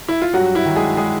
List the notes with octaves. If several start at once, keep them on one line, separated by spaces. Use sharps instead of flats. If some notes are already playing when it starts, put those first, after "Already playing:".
E4
F4
G2 F#3 F#4
E4
D#3 F#3
G#3 G#4
G#3 G#4